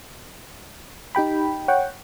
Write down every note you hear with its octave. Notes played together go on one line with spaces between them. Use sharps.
D#4 G4 G5 B5
C#5 F#5 G5